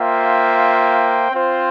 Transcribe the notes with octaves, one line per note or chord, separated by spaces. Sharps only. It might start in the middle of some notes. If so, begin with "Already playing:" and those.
Already playing: A#3 F4 C5 E5 G5
C4 F4 C5